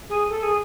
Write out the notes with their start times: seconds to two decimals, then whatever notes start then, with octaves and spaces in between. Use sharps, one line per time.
0.09 G#4
0.29 A4
0.42 G#4